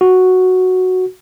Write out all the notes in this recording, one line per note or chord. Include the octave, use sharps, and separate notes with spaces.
F#4